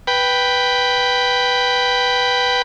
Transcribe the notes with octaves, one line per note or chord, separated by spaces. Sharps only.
B4 G5